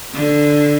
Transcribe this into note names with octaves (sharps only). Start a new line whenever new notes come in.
D3